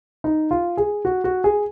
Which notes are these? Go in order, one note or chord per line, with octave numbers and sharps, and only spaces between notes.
D#4
F4
G#4
F#4
F#4
G#4